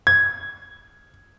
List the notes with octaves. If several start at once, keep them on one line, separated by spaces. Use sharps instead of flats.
G#6